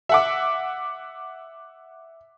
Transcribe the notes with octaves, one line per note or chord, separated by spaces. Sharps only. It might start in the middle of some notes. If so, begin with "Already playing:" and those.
E5 F#5 D6